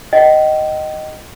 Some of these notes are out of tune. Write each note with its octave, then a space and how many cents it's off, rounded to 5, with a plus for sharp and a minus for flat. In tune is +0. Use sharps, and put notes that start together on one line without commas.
D#5 +0 G5 -40